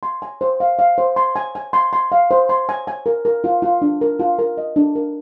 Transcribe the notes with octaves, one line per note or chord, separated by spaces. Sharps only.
C6
G#5
C5
F5
F5
C5
C6
G#5
G#5
C6
C6
F5
C5
C6
G#5
G#5
A#4
A#4
F4
F4
D4
A#4
F4
A#4
D#5
D4
A#4